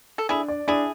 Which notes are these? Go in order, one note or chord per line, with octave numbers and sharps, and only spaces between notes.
A4
D4 E4 G#4
D5
D4 E4 G#4